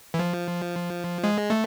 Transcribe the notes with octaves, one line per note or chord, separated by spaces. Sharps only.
E3
F3
G#3
A3